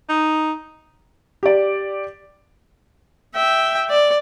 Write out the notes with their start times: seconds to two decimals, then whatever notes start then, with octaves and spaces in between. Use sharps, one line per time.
0.09 D#4
1.43 G4 D5
3.35 E5 G5
3.90 D5